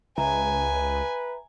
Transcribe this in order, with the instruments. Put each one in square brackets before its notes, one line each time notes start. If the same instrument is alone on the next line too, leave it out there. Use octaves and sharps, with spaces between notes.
[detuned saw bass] C#2 [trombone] B4 [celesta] E5 A#5 [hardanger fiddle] G#5